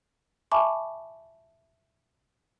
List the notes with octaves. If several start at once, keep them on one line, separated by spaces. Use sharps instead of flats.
E5 G#5 A5 B5 C#6 D6